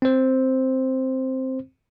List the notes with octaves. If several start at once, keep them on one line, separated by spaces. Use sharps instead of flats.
C4 C5